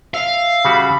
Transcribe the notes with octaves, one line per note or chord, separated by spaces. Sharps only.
E5 F5
C#3 G3 F#4 B5